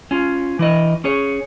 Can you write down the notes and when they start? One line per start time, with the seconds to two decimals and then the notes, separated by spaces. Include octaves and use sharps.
0.11 C#4 F4
0.59 E3 E4 D#5
1.04 C#4 G#4 C#5